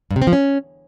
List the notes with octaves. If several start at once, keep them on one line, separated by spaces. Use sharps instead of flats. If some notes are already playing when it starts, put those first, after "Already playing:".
G2
C3
C4
F3
C#4